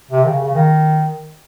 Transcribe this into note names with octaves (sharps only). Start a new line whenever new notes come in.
C3
D#3
C#3
C#3
D#3